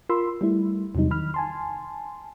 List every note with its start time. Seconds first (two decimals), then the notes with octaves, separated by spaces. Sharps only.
0.09 F4 A#4 B5 C6 E6
0.41 G3 A3 E4
0.95 E2 C3 F#3 G3 D#4
1.11 D#3 B5 F6
1.34 G#5 A5 C6